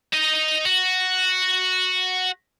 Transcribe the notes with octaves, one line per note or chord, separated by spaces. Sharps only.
D#4 D#5
F#4